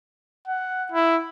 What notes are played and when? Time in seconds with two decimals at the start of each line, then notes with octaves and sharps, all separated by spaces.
0.48 F#5
0.92 E4